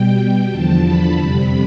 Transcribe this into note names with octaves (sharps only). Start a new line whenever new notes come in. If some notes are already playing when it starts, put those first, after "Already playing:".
Already playing: B2 G3 G5
G5
E2 D3 F3 A5
B5
F2 C3 G3 B5